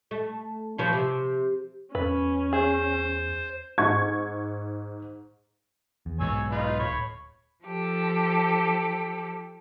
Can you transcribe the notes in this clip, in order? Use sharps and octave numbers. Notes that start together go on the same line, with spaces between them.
A3
C#3 F3 B3
C3
E2 C#4 B4
G#4 C5
G#2 C#6 G#6
E2
B1 G#2 B2 C#5 G#5 E6
D#4 F4 B4
D1 C#5 B5
F3 G4 A4